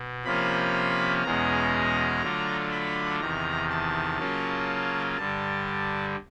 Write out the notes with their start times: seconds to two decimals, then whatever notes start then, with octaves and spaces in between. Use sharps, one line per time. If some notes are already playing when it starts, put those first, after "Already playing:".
Already playing: B2
0.25 C3 F3 A#3 C#4 F4 B5
1.23 E2 B2 G#3 C#4 A#5
2.22 D3 F#3 A3 D4 F4
2.71 B5
3.20 E2 C3 D#3 A#5
3.69 A5
4.18 C#3 F#3 A#3 C#4 F4
5.17 G2 D3 G3 A5